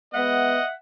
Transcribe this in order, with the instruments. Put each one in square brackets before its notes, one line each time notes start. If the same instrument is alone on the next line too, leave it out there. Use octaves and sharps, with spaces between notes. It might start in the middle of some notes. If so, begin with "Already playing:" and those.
[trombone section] G#3 B3 [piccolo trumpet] D#5 [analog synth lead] E5 [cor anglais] F#5